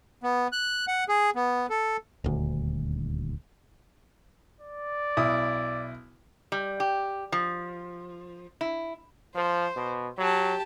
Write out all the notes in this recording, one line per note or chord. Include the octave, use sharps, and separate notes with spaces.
B3
F#6
F#5
G#4
B3
A4
D#1 D2
D5
B1 E4 D#6
G3
G4
F3
E4
F3 C5
B2
F#3 G4 A5